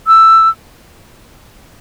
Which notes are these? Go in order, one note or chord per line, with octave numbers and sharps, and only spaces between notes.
E6